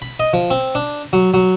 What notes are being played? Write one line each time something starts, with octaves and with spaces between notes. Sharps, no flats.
B5
D#5
F3
C4
D4
F#3
F#3